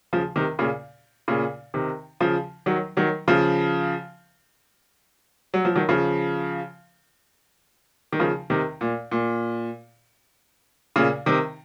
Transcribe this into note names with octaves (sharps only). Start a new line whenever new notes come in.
C#3 F3
C3 D#3
A#2 C#3
A#2 C#3
C3 D#3
C#3 F3
D#3 F#3
D#3 F#3
C#3 F3
F#3
F3
D#3 F#3
C#3 F3
D#3
C#3 F3
C3 D#3
A#2
A#2
A#2 C#3
C3 D#3